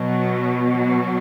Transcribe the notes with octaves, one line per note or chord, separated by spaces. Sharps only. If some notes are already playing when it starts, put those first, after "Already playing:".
Already playing: B2 F#3
F#3